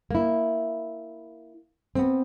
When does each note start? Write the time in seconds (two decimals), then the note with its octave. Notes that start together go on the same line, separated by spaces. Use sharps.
0.11 A#3 E4
1.95 B3 C4